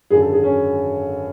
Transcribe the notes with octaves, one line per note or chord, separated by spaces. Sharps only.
G#1 F#2 D3 G#4
A4
G#4
C#4